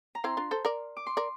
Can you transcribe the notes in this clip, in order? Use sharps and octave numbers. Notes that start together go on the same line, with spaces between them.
A#5
C4 E4 C6
D4 F4
A4 C5
A#4 D5
D6
C6
A#4 D5